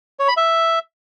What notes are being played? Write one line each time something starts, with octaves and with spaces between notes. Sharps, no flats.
C#5
B5
E5